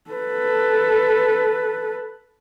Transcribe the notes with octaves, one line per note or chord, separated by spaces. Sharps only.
A4 B4